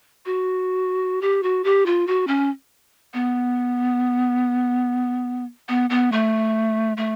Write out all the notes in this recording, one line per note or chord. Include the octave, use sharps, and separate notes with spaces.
F#4
G4
F#4
G4
F4
F#4
C#4
B3
B3
B3
A3
A3